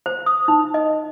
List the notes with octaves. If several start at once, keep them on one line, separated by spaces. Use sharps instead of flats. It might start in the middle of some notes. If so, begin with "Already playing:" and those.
C5
D#6
D#4
D#5